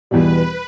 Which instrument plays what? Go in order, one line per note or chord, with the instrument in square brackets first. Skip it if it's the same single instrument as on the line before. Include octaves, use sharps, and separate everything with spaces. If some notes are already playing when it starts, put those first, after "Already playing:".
[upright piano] E2 B2 G3 [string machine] B4